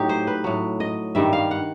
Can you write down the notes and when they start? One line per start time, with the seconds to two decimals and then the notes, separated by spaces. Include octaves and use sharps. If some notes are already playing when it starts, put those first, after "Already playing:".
Already playing: A2 F#3 D#4 G4
0.09 C5
0.27 B4
0.44 A2 F#3
0.80 D#5
1.15 G2 D#3 G3 E5
1.33 F5
1.51 F#5